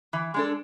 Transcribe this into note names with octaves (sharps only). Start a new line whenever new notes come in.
E3
G#3 D4 A4